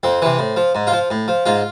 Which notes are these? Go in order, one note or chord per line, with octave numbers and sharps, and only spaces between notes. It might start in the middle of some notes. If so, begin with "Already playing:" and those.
F2 C4
C3 E3
A2
F3
G#2
F4
F3
A2
F3
G#2 F4